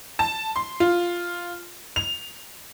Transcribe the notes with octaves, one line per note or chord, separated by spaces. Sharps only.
A5
C6
F4
F7